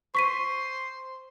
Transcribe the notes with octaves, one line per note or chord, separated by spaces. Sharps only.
C5 C#6 B6 D#7